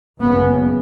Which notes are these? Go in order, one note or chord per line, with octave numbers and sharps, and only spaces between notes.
G#1 F#2 C#3 B3